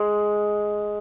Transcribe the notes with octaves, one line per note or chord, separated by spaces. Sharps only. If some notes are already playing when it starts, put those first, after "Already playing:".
Already playing: G#3